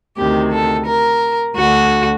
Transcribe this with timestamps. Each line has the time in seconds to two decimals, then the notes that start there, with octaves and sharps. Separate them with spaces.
0.17 D2 C3 D#3 G4
0.52 A4
0.87 A#4
1.56 D2 D3 F#4